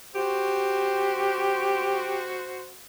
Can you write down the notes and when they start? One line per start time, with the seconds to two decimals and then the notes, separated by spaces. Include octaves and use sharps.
0.15 F#4 G4 C5